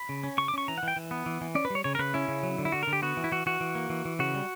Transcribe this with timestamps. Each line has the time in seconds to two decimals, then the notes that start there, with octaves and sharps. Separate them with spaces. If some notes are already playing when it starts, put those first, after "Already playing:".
Already playing: B5
0.09 C#3
0.24 C#4
0.38 C#3 C#6
0.48 D6
0.54 C#4 C#6
0.68 E3 A#5
0.78 F#5
0.83 E3
0.88 G5
0.96 E3
1.11 B3
1.26 E3
1.41 E3
1.55 C#4 D5
1.65 B4
1.70 G3 C#5
1.84 C#3 C#5
1.95 A#4
1.99 C#3 B4
2.14 C#4 E4
2.28 C#3
2.43 F#3
2.58 D3
2.65 E4
2.72 D3 F#4
2.83 A#4
2.87 D3
2.93 G4
3.02 B3 F#4
3.17 E3
3.24 E4
3.31 E3 F#4
3.46 E3 F#4
3.60 E3
3.75 A#3
3.90 E3
4.05 E3
4.19 C#3 F#4
4.35 G3